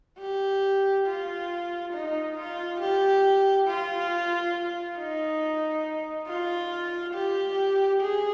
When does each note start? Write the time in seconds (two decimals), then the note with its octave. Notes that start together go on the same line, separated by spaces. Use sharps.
0.19 G4
1.07 F4
1.93 D#4
2.37 F4
2.80 G4
3.67 F4
4.98 D#4
6.28 F4
7.14 G4
8.02 G#4